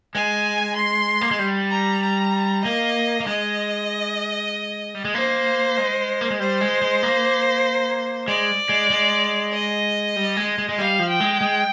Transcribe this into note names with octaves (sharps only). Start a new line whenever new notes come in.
G#3 G#5
C6
A#3
G#3
G3
A#5
A#5
A#3 D#5
A#3
G#3 D#5
G3
G#3
A#3 C5
G#3
A#3
G#3
G3 C5
G#3
G#3
A#3
G#3 D5
G#3
G#3
D#5
G3
G#3
G#3
G#3
G3 F5
F3
G5
G#3
G#3